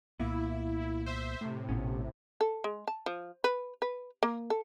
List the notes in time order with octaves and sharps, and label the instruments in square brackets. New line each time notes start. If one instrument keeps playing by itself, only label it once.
[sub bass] C2 [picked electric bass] A#2 A#3 B3 [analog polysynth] E4
[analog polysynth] C5 E5
A2 C3
[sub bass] A1 [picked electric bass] A#2 B3 C#4
[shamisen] A4
G#3
A5
F3
B4
B4
A#3
A4